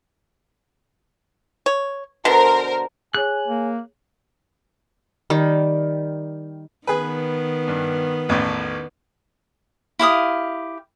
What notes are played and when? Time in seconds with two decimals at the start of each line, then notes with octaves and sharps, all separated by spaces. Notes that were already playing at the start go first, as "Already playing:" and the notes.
1.66 C#5
2.25 B2 D3 A#4 C5
3.14 G#4 C#5 G#5 F#6
3.48 A#3
5.30 D#3 G3
6.87 D#3 B3 G#4 B4
7.68 G2
8.29 A1 E2 A2
9.99 E4 G4 F5 D#6